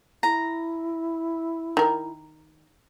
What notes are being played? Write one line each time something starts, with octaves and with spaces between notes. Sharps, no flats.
E4 A#5
D#3 A#4